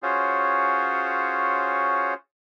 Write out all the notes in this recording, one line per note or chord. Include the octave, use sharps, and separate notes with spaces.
C#4 F4 F#4 G#4 C5 C#5